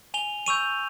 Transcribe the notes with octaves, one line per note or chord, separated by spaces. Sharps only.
G#5 F7 G7
C#6 E6 G6 D#7 F7